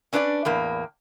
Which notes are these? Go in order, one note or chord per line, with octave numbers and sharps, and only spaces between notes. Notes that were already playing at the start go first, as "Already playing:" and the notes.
C#4 D4 B4 C#5 D5
E2 A2 A#3